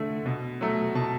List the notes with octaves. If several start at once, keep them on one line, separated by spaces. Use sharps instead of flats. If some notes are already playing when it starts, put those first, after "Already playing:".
Already playing: D3 A3
B2
F#3 A3
B2 A5